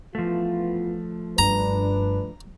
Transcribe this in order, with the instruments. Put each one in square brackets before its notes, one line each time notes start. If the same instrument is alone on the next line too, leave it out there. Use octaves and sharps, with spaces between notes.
[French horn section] E3 B3 F4 [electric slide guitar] F3 A3
[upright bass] F#1 G2 [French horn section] D4 B4 [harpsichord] A#5